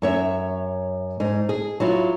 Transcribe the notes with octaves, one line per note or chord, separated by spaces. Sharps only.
F#2 C#5 E5
G#2 D#4
G#4
F#3 E4 F4